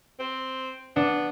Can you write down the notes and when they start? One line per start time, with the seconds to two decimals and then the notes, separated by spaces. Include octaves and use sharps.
0.20 C4
0.96 B3 D4